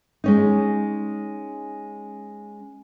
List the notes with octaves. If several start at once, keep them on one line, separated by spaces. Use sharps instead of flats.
G#3 C#4 D#4